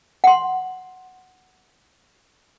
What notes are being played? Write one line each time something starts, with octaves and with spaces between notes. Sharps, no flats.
F#5 C6